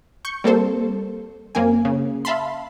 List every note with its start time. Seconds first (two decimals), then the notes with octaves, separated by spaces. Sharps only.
0.25 C#6 G6 C#7
0.44 G3 A#3 C4 A4 C5
1.55 F#2 A#3 C4 G#5
1.85 C#3
2.25 E5 F5 A5 B5 C6